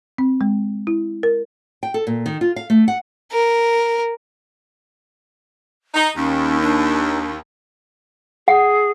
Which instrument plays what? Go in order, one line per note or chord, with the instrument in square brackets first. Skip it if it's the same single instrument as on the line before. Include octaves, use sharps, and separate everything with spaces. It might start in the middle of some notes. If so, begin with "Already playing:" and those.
[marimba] C4
G#3
E4
A#4
[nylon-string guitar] G5
A4
A#2
D#3
F4
F5
A3
F#5
[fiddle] A#4
[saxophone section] D#4
[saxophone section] D#2 [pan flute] C#4
[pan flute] D4
[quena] G#4 [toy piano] F#5